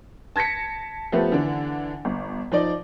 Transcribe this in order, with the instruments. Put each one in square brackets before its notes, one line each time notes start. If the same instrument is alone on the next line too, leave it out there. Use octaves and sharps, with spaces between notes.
[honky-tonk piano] A5 G#6 A#6 B6 C#7
F3 A3 B3 G4
D3 E3 D4
G1
F3 D#4 D5